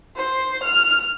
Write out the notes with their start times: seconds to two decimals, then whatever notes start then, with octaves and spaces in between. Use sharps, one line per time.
0.16 C5
0.63 F6